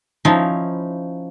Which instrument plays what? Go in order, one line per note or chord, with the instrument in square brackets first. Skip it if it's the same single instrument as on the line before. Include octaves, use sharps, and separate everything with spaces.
[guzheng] F3 C#4 D#4 E4